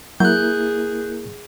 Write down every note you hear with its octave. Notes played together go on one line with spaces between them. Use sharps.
F#3 A#3 E4 G#4 A#4 F#6 G6